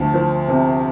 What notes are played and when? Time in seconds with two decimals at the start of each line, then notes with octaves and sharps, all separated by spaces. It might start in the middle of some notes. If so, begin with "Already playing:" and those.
Already playing: D2 F3 A5
0.14 F3
0.48 C3